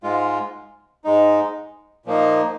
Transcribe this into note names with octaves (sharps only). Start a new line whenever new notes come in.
G#2 G#3 F4
G#2 G#3 D#4
A#2 F3 A#3 D#4